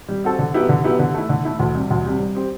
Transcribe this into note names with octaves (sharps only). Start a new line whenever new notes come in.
G3
C4 F#4 A4
D3
F#3 B3 E4 G4
D3
F#3 B3 E4 G4
D3
A3 E4
D3
A3 E4
D2
C3 G3
D2
C3 G3
G3
C4 G4